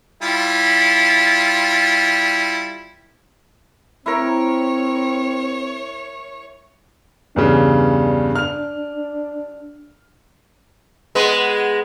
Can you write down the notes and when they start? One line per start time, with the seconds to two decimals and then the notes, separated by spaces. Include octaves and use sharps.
0.22 G3 E4 F4
4.06 C4 E4 A#4 C#5
7.36 E2 G2 C#3 D4
8.36 F6 F7
11.15 G#3 B3 B4